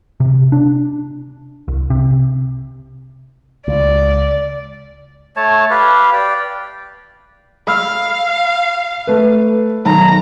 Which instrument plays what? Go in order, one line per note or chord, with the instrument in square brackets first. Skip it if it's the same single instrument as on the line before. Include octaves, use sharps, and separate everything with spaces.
[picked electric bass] C3
D4
C2
C3
[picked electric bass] C#2 [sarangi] D5
[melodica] A3 C#5 A5
G4 B4 F5
D5 G5
[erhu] F5 [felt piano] B5 E6 F6
[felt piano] A3 B4
[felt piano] B1 D#3 B5 [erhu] A#5